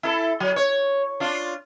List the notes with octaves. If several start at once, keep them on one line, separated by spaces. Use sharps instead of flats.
E4 A4
F#3
C#5
D4 F4